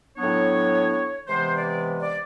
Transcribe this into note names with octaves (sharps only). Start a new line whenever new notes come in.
A2 F#3 B3 D4 C#5
C3 E3 G#3 B3 C5
D5
D5